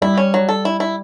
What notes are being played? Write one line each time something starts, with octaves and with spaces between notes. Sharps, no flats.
G3 E4
C#4
F#3
A4
E4
E4